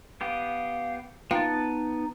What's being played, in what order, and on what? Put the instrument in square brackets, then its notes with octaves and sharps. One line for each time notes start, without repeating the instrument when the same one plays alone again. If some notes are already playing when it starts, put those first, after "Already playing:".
[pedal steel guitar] B3 G4 [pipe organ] F5
[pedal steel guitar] B3 A5 [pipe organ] D#4 [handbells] F4 F5 G5